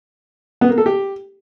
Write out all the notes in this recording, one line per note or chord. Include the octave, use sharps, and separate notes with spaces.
B3
A#3
A4
G4